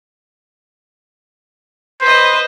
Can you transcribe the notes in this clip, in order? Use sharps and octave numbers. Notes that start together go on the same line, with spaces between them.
B4 C5 D#5